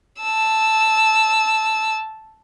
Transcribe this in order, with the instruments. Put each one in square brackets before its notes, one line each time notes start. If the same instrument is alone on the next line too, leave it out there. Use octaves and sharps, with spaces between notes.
[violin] A5 E6